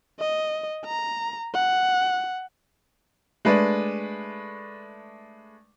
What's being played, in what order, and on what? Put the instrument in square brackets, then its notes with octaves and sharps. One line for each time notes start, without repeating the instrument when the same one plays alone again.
[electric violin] D#5
A#5
F#5
[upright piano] G#3 A3 D4 B4 D5